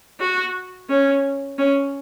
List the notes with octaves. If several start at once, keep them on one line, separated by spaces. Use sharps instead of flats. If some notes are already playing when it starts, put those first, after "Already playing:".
F#4
C#4
C#4